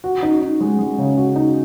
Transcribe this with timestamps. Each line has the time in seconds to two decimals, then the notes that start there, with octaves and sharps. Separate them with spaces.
0.04 F#4
0.23 D#4
0.41 D#4
0.61 G#3
0.79 G#3
0.98 C#3
1.17 F#4
1.36 D#4